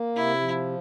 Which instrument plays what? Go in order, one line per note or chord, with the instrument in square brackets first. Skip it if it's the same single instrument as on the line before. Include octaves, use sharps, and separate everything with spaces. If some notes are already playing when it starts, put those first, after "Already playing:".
Already playing: [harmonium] A#3
[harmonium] C3 [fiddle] E4
[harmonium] F3